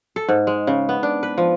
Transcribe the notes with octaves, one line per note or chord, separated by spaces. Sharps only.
A4
G#2
G#3
C#3
B3
D4
B4
F3